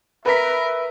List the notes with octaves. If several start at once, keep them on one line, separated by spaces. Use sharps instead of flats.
A#4 B4 E5 B6